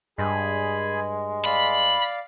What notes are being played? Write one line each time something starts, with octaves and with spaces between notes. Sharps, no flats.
G2 G#3 G#4 G#5 B5
D5 F5 B5